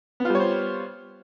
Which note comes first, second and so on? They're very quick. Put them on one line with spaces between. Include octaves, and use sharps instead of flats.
B3 F4 G3 C#5 C5